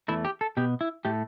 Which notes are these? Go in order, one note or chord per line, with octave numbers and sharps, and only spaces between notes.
E2 E3 A3 E4
G4
A4
B2 B3 G4
E4
A2 A3 G4